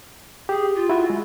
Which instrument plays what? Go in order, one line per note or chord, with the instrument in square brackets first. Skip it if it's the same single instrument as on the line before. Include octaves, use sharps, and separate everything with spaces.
[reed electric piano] G4 [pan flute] G#4
[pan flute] F4
[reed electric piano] E4 F#4 E5
G#3